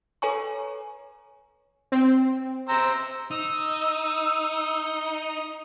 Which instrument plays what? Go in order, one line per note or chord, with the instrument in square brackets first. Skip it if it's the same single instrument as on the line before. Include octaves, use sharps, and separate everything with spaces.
[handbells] A4 B4 C#5 G#5 A#5 C#6
[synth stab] C4
[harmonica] C5 A#5 E6
[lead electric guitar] D#4 [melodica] D#6 [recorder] E6